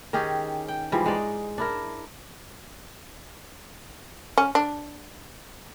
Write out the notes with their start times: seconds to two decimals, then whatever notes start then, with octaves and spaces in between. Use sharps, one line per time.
0.13 D#3 C#4 G4 G#4
0.68 G5
0.92 G#2 E3 F3 G3
1.06 G#3 D#4 D5
1.58 D4 E4 A#4
4.38 C#4
4.55 D4